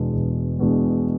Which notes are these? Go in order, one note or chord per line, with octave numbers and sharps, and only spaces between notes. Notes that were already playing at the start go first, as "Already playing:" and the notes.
Already playing: E1 E2 B2 G#3 D4
E1
E2 B2 G#3 D4